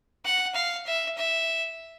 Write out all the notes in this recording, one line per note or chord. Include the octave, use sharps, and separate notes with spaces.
F#5
F5
E5
E5